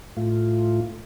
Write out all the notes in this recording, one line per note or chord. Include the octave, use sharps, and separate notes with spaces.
A2 A3 F4